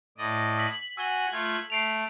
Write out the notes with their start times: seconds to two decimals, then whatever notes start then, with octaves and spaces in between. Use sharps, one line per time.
0.18 A2 D5 D#5
0.58 E6 B6 F#7
0.97 F#4 G#5 E6 G7
1.32 A3 F4 G#6
1.70 A3 C7 D7 F7